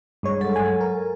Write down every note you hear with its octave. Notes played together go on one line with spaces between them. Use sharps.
G2 G#3 C#5
F#3 A4
G#5
A#4